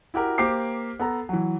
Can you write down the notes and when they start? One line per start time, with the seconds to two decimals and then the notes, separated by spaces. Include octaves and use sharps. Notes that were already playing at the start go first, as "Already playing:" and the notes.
0.14 E4 F#4 G4 A#4
0.38 A#3 G4 C5 D6 C7
0.99 B3 A4 A#5
1.29 E3 F#3